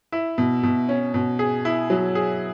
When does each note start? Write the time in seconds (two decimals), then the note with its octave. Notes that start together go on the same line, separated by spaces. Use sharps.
0.12 E4
0.38 B2
0.63 B2
0.89 C#4
1.14 B2
1.39 G#4
1.65 E4
1.90 F#3
2.15 G#4